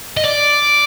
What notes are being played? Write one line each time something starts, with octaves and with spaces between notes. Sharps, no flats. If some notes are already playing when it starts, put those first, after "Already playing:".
D#5
D5